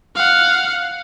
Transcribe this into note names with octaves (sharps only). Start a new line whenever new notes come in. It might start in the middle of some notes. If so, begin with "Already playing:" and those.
F5 F#5